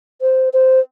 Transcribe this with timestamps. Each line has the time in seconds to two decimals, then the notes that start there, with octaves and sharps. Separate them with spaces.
0.22 C5
0.53 C5